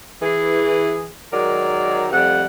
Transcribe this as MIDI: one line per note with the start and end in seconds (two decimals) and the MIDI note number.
0.22 1.07 52
0.22 1.07 68
1.33 2.07 51
1.33 2.07 54
1.33 2.07 56
1.33 2.07 70
1.33 2.07 74
2.11 2.44 41
2.11 2.44 48
2.11 2.44 55
2.11 2.44 57
2.11 2.44 78